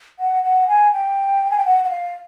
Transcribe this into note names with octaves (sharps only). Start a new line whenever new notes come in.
F#5
F#5
G#5
G5
G#5
G5
F#5
F#5
F5